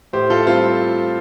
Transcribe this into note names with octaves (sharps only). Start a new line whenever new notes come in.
A2 G4 C5
F4 A4
G3 C4 F4